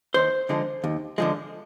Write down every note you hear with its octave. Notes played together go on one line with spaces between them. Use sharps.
D#2 C5
D3 F3 G#3
D#2
D3 F3 G#3